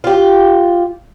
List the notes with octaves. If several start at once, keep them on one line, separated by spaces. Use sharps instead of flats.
F4 G4